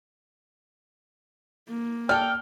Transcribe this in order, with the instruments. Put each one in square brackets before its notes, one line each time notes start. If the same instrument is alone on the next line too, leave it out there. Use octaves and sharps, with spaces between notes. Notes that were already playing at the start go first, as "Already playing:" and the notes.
[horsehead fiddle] A#3
[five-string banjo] A4 D5 [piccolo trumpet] G5 [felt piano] F6